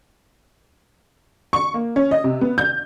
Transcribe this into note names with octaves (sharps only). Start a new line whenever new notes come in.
C#6
A#3
C#4
D#5
C3
B3
G6